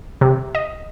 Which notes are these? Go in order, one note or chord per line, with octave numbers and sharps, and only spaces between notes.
C3
D#5